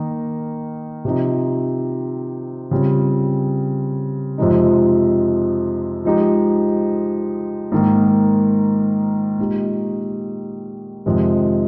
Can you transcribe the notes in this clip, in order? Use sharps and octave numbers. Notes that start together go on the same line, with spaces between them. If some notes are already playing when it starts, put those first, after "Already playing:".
Already playing: D#3 A#3 D#4
C3 F3 C4 D#4
C#3 G3 C4 F4
F2 C3 F3 G#3 D#4
F3 G#3 D#4 G4
G#2 D#3 A#3
A#2 G#3 D#4 G4
F2 C3 D#3 G#3